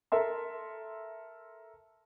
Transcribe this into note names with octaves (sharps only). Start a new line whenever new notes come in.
A4 A#4 E5 C6